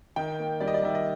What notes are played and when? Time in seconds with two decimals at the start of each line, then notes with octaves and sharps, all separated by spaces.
0.16 D#3 G5
0.39 A#3
0.60 G3 D5
0.68 D#5
0.74 D5
0.83 D#3 E5
0.95 D#5